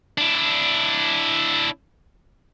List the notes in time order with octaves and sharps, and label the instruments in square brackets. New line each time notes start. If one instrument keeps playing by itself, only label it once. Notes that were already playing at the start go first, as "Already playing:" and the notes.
[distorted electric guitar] D4 E4